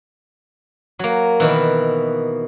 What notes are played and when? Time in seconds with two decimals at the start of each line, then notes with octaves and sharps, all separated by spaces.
0.99 F#3 A#3
1.40 B2 D#3 E3